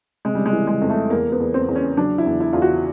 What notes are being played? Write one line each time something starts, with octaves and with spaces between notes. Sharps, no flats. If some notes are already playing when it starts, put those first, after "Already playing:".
C3 G#3
G3
G#3
E3
G#3
F2
A3
E2 A#3
B3
E2
C4
E2
C#4
F#3 D4
E4
E2
E4
E2 F4
F#4